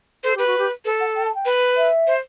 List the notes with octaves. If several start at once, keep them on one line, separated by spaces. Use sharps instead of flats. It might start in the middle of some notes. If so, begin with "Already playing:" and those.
A4 C5
G4 B4
F#4
G4
A4 B4
F#5
G5
A5
G5
B4
E5
C5